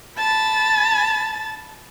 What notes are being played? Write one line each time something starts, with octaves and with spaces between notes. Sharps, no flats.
A5 B5 A6